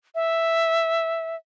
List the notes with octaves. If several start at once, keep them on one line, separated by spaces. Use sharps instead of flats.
E5